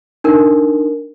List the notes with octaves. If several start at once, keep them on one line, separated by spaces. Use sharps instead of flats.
D4 D#4 A#4